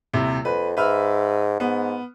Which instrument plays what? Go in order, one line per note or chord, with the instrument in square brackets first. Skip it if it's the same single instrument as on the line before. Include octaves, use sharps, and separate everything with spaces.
[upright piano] D#1 C3 E4
[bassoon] F2 [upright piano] B4
[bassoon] G#2 [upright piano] B4 E5 F6
[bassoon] G#2 [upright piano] B3